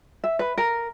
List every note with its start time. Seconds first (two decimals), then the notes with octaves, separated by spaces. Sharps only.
0.24 E5
0.39 B4
0.58 A#4